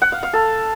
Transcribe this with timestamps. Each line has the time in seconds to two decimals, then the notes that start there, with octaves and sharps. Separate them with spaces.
0.02 F#5
0.12 F5
0.23 F5
0.33 A4